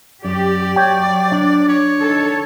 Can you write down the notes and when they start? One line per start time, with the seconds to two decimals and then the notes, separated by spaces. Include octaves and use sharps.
0.25 F#2 G4 D5
0.76 F#3 C#5 G5
1.32 D4
1.68 C#5
1.98 D#3 A4